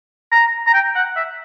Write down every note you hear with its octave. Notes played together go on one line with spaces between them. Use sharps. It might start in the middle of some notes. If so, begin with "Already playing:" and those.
A#5
A#5
G5
F#5
E5